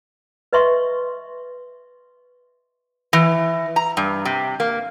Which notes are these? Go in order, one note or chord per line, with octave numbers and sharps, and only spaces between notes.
B4 D#5 E5 C6 C#6
E3
A#5
G2
C3
A#3